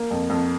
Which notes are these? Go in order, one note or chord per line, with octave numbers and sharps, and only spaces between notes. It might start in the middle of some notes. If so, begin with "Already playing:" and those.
Already playing: A#3
F2
F2